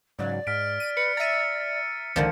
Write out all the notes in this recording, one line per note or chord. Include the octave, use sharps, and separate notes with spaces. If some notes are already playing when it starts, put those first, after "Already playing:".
G#2 C#3 F#3 D5
G#2 F6 B6 D7
D#7
B4 C#7
E5 A#5 A6 D#7
C#2 D3 D#3 F3 D5